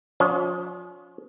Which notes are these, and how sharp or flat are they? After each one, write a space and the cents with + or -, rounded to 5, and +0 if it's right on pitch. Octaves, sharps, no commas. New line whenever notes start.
F3 +40 C#4 +40